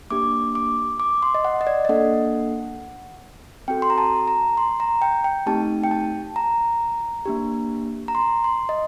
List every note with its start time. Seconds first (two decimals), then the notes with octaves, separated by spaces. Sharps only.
0.10 A#3 D4 G4 D6
0.55 D6
1.00 D6
1.22 C6
1.35 D#5
1.45 F#5
1.61 D#5
1.67 D5
1.85 D#5
1.89 A#3 D4 A4 F#5
3.68 C4 F#4 A4 G5
3.82 C6
3.90 A#5
3.98 A5
4.28 A#5
4.57 C6
4.80 A#5
5.02 G5
5.24 G5
5.46 A3 C4 D#4 G4 A5
5.83 G5
5.91 A5
6.36 A#5
7.25 A#3 D4 G4
8.08 A#5
8.15 C6
8.44 C6
8.69 D#5